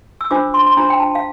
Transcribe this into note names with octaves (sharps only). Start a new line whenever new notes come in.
E6
D4 F4 C5 D6
C6
C6
D4 F4 C5 A#5
G5
A5
F5